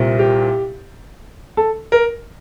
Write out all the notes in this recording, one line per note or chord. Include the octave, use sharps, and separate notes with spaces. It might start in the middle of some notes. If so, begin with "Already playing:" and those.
Already playing: C2 A#2 G3 C4
G4
A4
A#4